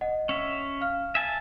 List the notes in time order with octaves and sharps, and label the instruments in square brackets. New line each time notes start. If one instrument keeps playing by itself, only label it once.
[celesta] D#5 F#5
[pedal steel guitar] C#4 E5
[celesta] F5 F6
[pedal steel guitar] E5 G#5 A5